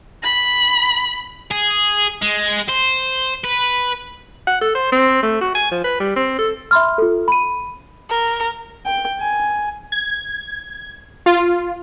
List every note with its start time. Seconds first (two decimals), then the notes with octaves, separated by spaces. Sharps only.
0.23 B5
1.51 G#4
2.22 G#3
2.69 C5
3.44 B4
4.47 F#5
4.61 A4
4.75 C5
4.92 C4
5.22 A3
5.41 F#4
5.55 G#5
5.72 F3
5.84 B4
6.00 G3
6.16 C4
6.39 A4
6.71 E5 B5 C6 F6
6.98 F4 A4
7.28 B5 D#7
8.10 A#4
8.86 G5
9.20 G#5
9.92 G#6
11.26 F4